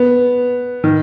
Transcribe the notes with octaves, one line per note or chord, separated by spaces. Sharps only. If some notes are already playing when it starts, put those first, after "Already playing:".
Already playing: B3
D#3